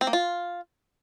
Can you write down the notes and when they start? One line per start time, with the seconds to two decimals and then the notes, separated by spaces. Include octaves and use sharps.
0.01 C4
0.07 A#3
0.13 F4